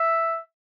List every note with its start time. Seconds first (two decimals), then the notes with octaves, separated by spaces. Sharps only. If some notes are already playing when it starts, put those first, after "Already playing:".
Already playing: E5